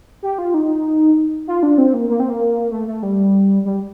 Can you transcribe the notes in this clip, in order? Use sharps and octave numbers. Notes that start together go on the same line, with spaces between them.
G4
F4
D#4
F4
D4
C4
A#3
A#3
C4
A#3
A3
A3
G3
G3